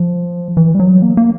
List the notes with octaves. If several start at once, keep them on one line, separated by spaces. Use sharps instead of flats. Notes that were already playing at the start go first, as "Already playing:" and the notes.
Already playing: F3
E3
G3
F#3
A#3
A#3